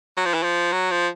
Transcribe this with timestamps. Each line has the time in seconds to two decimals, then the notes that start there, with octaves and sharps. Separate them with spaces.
0.17 F#3
0.26 F3
0.34 E3
0.43 F3
0.73 F#3
0.91 F3